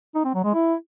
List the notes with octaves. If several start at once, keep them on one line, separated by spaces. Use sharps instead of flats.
D#4
C4
F#3
G#3
E4